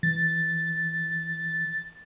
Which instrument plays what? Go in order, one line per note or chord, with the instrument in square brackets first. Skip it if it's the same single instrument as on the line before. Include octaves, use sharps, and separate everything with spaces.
[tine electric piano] E3 [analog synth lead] A6